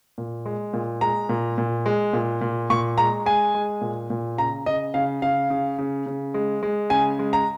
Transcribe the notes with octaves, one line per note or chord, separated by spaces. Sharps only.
A#2
G#3
A#2
G#3 A#5
A#2
A#2
G#3
A#2
A#2
A#2 C#6
G#3 A#5
G#3 G#5
G#3
A#2
A#2
C#3 A#5
C#3 D#5
C#3 F5
C#3 F5
C#3
C#3
C#3
G#3
G#3
C#3 G#5
G#3
A#5